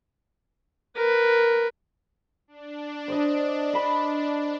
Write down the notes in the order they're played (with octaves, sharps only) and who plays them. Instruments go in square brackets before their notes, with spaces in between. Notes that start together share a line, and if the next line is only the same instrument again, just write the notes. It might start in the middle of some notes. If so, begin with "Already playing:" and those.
[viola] A#4 B4
[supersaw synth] D4
[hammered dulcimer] C5 D5 D#5
D#5 B5 C6